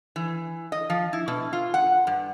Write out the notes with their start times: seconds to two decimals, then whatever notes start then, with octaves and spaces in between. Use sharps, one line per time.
0.16 E3
0.72 D#5
0.90 F3
1.13 E4
1.28 B2
1.53 F4
1.74 F#5
2.07 G2